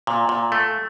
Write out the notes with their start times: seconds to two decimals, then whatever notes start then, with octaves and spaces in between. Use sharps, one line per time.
0.07 A#2
0.29 A#2
0.52 A3